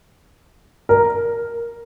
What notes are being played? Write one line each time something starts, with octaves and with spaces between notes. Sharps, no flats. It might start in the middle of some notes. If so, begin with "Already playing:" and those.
A#4